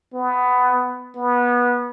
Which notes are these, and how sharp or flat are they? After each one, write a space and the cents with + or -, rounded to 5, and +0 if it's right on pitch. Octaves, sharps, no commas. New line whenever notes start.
B3 +15
B3 -20